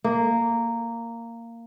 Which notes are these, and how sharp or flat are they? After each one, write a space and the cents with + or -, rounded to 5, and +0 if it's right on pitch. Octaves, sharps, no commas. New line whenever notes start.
A#3 -10